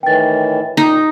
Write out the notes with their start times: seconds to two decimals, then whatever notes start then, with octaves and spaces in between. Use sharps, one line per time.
0.03 A2 D#3 E3 G5 A6
0.77 A#2 D#4 G4